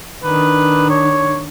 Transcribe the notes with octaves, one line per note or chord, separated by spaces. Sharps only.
D#3 D4 B4
C#5